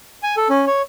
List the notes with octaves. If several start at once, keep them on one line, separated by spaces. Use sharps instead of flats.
G#5
A4
C#4
C#5